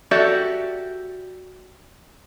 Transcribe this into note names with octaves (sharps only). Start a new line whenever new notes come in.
F#4 G4 A4 D5 E5